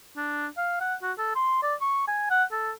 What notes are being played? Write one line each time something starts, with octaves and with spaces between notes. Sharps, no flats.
D4
F5
F#5
F#4
A4
C6
D5
C#6
G#5
F#5
A4